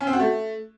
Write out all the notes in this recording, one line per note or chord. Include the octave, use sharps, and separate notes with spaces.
C#4
C4
F#4
A3